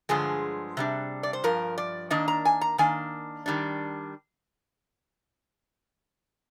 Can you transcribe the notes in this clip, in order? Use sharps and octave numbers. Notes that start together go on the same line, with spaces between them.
G2 D3 F3 G#3 G#4
C3 G3 D4
D5
C5
G2 F3 A#4
D5
D#3 A#3 D4 D#5
A#5
G#5
A#5
D#3 A#3 D4 G#5
D#3 G3 D4